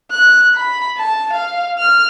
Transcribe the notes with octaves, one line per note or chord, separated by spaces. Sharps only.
F#6
B5
A5
F5
F6